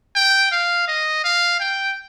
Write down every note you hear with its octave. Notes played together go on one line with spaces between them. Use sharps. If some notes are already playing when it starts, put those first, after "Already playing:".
G5
F5
D#5
F5
G5